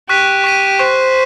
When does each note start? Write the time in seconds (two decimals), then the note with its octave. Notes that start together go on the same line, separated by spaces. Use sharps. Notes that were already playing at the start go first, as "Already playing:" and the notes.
0.09 G4 C#6 F#6 B6 D#7
0.44 C#6 F#6 B6 D#7
0.79 C5 C#6 F#6 B6 D#7